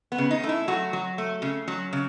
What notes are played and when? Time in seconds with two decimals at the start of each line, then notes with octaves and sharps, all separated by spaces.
0.12 B3
0.18 C#3
0.31 D#4
0.43 A3
0.49 E4
0.68 F#3 F#4
0.93 F#3
1.18 A3
1.42 C#3
1.68 F#3
1.93 C#3